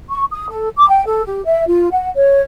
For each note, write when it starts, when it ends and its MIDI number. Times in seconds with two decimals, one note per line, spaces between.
0.10 0.25 85
0.31 0.47 87
0.50 0.69 69
0.77 0.88 86
0.89 1.03 79
1.06 1.25 69
1.25 1.44 67
1.45 1.65 76
1.67 1.88 65
1.92 2.10 78
2.16 2.41 73